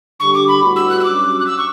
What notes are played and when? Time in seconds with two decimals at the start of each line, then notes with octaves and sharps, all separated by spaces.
0.19 D3 G3 D4 G4 C#6
0.34 D6
0.48 B5
0.62 A2 G3 B3 F#4
0.76 E6
0.89 F#6
0.99 E6
1.03 G2 F#3 C#4 F#4 D6
1.39 F#6
1.46 E6
1.58 C#6